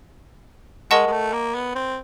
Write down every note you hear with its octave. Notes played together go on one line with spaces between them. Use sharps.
G#3 A#4 D#5 F#5 A5 C#6
G#3
A3
A#3
B3
C4